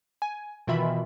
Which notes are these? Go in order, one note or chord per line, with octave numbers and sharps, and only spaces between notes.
G#5
B2 D#3 E3 F4 E5 B5